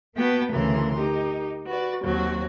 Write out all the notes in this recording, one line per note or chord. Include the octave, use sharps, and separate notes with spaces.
A#3 B3 F#4 G5 A5
D2 C#3 E3 A#4 C6
D#4 G4 A#4
F#4 B4 D5
D#2 F#3 C4 F#4